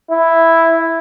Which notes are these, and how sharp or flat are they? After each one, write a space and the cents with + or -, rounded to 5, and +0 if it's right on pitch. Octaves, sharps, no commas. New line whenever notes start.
E4 +0